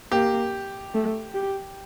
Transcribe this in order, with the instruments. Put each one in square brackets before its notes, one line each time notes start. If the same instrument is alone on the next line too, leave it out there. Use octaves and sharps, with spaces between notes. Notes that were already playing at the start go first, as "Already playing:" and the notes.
[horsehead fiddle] A#3 [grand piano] G4
[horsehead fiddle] A3
G4